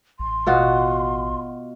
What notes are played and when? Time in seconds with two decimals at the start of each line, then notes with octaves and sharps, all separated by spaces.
0.20 A1 C6
0.46 B2 F4 F#4